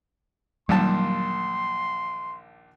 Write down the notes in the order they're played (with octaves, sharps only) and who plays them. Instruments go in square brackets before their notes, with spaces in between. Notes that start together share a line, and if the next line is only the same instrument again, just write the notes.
[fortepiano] A#1 D#2 A5 [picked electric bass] F#3 G3 [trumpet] C6